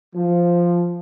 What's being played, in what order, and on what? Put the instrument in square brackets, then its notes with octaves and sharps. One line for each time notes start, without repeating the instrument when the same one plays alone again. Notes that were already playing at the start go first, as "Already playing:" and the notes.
[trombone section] F3